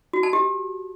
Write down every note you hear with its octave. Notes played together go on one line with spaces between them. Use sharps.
F#4
A5
G4